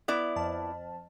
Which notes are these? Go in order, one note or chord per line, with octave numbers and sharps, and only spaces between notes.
B3 E4 D5
F2 A5